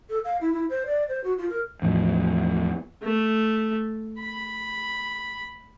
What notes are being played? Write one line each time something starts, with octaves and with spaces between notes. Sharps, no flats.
A4
F5
E4
E4
C5
D5
C5
F#4
F4
A#4
E2 A2 F3
A3
B5